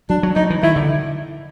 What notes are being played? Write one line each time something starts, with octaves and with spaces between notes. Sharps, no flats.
F#3 D4
F#3
F#3 D#4
E3
D#3 E4
D3